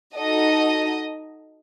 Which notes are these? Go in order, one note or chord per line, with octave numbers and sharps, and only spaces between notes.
D#4 F#4 A4 D#5